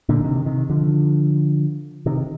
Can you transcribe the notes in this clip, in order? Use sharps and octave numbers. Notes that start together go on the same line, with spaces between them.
A#2 D3
C3 D#3
C3 D#3
D3 F3
C3 D#3